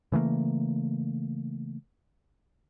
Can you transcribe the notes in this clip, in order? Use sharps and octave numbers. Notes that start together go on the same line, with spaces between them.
C#3 E3 A3 A#3